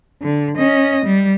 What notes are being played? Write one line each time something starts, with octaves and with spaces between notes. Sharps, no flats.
D3
C#4 D#5
G3